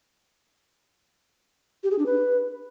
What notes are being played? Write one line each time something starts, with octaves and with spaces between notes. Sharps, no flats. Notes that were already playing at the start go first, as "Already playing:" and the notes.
G4
G#4
D4
B4